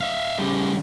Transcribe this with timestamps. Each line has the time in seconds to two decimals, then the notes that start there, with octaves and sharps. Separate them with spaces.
0.01 E5 F5
0.39 C#3 G3